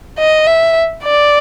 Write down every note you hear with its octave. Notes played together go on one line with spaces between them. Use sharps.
D#5
E5
D5